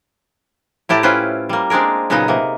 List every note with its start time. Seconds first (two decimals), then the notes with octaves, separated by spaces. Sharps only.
0.89 A2 E4 G4 A4 A5 A#5
1.03 C#4 E4 F4 B4 C5
1.49 G3 A#3
1.70 G#3 C4 D4 G#4 A#4
2.10 A#2 C#3 F#3 B3 D#4 D#5
2.28 C3 A#3